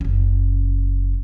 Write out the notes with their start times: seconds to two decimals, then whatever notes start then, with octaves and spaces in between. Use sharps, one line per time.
0.01 F#1 C#4